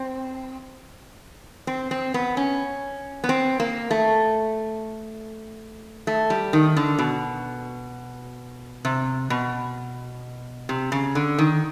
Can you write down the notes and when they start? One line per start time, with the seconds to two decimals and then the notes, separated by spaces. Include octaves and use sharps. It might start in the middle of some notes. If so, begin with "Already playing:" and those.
Already playing: C4
1.67 C4
1.91 C4
2.14 B3
2.37 C#4
3.24 B3
3.29 C4
3.60 A#3
3.91 A3
6.07 A3
6.30 G3
6.53 D#3
6.77 D3
6.99 B2
8.85 C3
9.30 B2
10.69 C3
10.92 C#3
11.15 D3
11.38 D#3